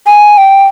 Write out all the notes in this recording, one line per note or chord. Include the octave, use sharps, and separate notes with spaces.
G#5
G5